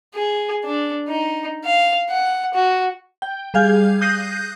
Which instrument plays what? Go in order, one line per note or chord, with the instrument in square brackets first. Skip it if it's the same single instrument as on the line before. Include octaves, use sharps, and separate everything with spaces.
[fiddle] G#4
D4
D#4
F5
F#5
F#4
[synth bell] G5
G3 G#4 F5 G6 G#6
D#6 F#6 G6 A#6 C7 D#7